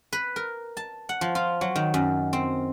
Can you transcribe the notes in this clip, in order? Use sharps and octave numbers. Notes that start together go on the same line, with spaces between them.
B4
A#4
A5
F#5
F3
F4
F#3
D#3
F#2
C4